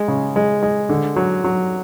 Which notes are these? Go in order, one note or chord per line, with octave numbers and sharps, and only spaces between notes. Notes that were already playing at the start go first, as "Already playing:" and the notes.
Already playing: G#3
C#3
G#3
G#3
D3
F#3
F#3